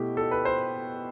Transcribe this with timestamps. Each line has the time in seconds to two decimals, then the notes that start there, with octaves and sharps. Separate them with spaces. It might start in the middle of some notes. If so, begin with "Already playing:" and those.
Already playing: B2 A3 E4 G4
0.17 A4
0.31 B4
0.45 C5